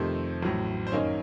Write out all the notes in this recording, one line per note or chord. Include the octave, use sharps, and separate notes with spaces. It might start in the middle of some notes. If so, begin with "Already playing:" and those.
Already playing: F2 C3 D#3 A3 C5
A1 A2 F#3
C5
F#2 D#3 A#3 D#4 C#5